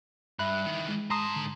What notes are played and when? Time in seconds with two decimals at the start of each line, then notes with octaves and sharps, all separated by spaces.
0.39 G2 E5 B5 F#6
0.65 D#3 E3
0.88 G#3
1.10 G#2 A5 A#5 C6 D#6
1.36 D3